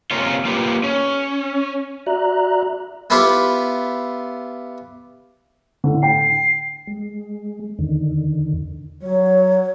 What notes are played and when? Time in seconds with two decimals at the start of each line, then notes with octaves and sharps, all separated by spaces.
0.11 C3 A#3 C#4 F4
0.45 A#3 F4 G4 B4
0.83 C#4
2.07 F#4 D5 E5 A#5 F#6
3.10 B3 E4 F4 G4 B4
5.84 A2 D3
6.03 G5 C7
6.87 G#3
7.79 E2 D3 D#3
9.02 F#3 C#5